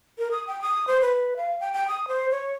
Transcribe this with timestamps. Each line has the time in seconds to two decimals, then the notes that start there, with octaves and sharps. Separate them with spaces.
0.18 A#4
0.31 D#6
0.47 G5
0.62 D#6
0.88 C5
1.01 B4
1.37 F5
1.60 G5
1.73 G5
1.88 D#6
2.08 C5
2.31 C#5